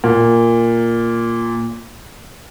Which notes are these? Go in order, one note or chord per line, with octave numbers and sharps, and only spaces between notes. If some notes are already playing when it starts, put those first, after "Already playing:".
A#2